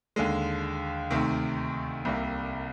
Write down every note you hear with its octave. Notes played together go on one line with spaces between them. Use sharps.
D#2 D3 G#3
D2 C3 D#3
C2 C3 G3 A#3